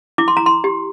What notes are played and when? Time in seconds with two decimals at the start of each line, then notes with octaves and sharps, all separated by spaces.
0.18 E4 D6
0.28 C6
0.37 A#5
0.46 C6
0.64 G4